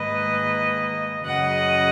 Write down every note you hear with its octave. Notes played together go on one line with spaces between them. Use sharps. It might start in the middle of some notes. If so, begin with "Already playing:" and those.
Already playing: G#2 D#3 A#3 B4 D#5
F#2 C#3 F#3 D#5 F#5